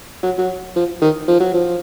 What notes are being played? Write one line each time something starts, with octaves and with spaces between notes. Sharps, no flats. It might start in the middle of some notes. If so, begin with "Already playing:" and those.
F#3
F#3
F3
D#3
F3
F#3
F3